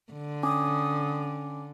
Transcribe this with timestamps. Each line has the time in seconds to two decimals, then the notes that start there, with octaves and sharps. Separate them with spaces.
0.12 D3
0.43 C#4 G#5 D6 D#6